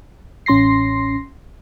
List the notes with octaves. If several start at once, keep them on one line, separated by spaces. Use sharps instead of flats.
A1 C#4 C6 A#6 C7